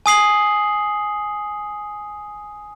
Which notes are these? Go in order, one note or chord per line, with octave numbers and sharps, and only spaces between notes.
G#5 D#6 C7 F#7